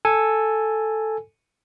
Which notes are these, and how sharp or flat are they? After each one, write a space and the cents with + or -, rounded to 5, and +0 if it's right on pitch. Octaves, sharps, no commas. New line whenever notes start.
A4 +0 G#5 +0